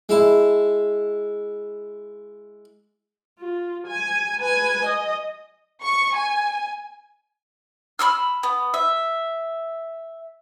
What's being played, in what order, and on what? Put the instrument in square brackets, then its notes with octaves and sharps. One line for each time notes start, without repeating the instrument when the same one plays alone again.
[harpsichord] G#3 E4 A5
[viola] F4
G#5
B4 G#5
D#5
[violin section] C#6
G#5
[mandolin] B5 D6 E6 F6
B3
E5